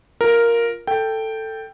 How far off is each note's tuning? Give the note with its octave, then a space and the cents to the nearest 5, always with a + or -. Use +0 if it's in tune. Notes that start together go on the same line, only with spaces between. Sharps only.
F4 +0 A#4 +0
A4 +10 G5 +0